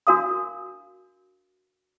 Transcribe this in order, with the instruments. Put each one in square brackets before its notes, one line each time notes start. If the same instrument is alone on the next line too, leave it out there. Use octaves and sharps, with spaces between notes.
[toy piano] D4 F#4 A#4 F5 D#6